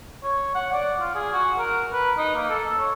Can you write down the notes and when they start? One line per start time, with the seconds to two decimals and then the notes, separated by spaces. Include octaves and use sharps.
0.24 C#5
0.55 F#5
0.73 D5
1.00 F4
1.15 G#4
1.32 F#4
1.59 A#4
1.92 B4
2.18 D#4
2.36 A#3
2.49 A4
2.79 C#5